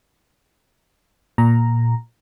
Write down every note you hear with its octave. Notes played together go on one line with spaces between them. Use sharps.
A#2 A#5